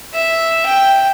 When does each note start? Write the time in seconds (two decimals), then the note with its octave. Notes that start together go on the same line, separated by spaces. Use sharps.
0.14 E5
0.66 G5